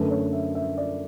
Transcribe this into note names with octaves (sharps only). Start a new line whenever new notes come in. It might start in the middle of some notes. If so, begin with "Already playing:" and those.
Already playing: F#2 D3 A3 B4
C#5
E5
E5
D5